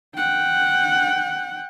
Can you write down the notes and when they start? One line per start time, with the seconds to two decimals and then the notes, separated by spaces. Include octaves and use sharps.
0.16 F#5 G5